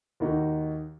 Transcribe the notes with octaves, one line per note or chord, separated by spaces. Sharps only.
D#2 D#3 A#3 D#4 F#4